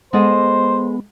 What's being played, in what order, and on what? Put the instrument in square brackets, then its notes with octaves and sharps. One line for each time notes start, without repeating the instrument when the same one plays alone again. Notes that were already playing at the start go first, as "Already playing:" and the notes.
[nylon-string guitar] G#3 A4 D#5 [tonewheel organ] B3 [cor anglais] C5